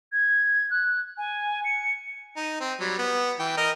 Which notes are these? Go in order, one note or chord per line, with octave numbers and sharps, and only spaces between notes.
G#6
F#6
G#5
C#7
D#4
C4
F#3 G3
B3
E3 G5
A#4 D#5